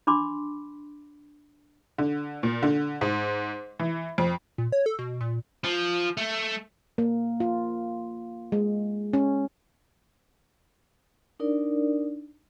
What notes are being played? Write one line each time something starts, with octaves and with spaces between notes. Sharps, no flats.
D4 B5 C6 D6
D3
A#2
D3
G#2
E3
F2
A#2
C#5
A4
B2
A#2
F3
A3
A#3
F4
G#3
C#4
D4 D#4 A#4 D5